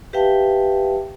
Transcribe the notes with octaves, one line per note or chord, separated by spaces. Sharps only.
G4 B4 E5 F5 G5 A5